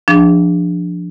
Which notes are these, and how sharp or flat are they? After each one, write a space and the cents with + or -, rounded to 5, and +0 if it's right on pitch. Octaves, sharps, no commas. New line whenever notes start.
F3 +0 D4 +0 G#4 -35